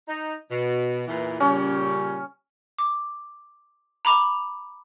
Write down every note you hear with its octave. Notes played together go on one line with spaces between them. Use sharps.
D#4
B2
E2 A#2 E3
A#2 C#3 G3 C#4
D6
A#5 B5 D6 F7